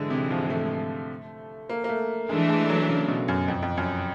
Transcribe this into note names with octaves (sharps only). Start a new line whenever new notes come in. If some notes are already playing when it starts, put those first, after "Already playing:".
Already playing: G#2 D3 E3 G#3
C3
F3
A3
A#3
A#3
A3
E3 G#3 A3 D4
G#3
F#3
C#3
B2
F#2
F2
F2
F#2